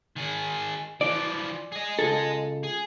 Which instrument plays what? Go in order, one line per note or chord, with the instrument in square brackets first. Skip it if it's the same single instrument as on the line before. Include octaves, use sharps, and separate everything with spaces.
[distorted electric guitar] D#3 G#4
[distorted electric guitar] E3 F3 [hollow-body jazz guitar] D5
[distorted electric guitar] G#4 D#5
[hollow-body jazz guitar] C#2 A4
[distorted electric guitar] G#4